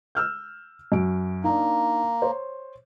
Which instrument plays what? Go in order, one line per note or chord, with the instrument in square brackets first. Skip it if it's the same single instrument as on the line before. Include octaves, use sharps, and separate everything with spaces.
[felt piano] E6 F6 G6
F#2 F#4 D7
[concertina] A#3 [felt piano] D4 D#4
[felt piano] C5 C#5